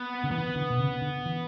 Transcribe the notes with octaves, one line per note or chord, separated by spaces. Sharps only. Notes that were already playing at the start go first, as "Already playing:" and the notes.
Already playing: B3
D3
E3 B3
D3
B2
C#3
D3
E3